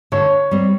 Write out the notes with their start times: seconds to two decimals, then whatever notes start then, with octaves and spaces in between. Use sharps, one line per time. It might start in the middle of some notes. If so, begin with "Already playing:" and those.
0.12 D3 C#5
0.51 G3 C4